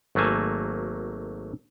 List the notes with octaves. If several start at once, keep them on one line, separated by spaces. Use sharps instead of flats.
G#1 F#3 A3 A#3 G#5 A5